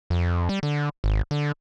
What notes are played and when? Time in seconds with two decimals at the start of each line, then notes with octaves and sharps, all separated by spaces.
0.10 F2
0.49 G3
0.63 D3
1.04 G#1
1.31 D3